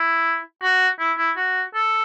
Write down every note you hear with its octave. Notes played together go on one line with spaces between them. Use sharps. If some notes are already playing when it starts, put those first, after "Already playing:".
Already playing: E4
F#4
E4
E4
F#4
A4